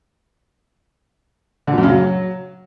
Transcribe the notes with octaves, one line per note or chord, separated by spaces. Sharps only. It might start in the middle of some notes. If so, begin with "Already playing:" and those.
D3
A#2
F#2
C#3
F#3